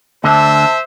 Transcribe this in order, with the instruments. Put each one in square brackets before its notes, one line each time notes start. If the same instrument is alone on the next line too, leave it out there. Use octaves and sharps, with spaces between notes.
[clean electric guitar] D2 D3 [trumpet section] C5 E5 [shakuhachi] A5